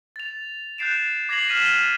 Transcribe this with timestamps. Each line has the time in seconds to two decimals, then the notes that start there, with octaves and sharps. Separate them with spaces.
0.16 A6 F7
0.78 F#6 G6 A6 C7 D7 E7
1.29 D6 G#6 A#6 C7 F7 F#7
1.49 F6 B6 D#7 E7
1.62 F6 A6 D#7 G7